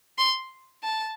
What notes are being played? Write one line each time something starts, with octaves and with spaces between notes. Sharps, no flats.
C6
A5